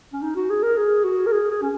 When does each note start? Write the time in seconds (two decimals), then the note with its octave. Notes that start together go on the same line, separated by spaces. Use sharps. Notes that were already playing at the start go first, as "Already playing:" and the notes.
0.13 C#4
0.22 D#4
0.35 F#4
0.50 G#4
0.63 A#4
0.77 G#4
1.04 F#4
1.26 A#4
1.32 G#4
1.50 G#4
1.62 C#4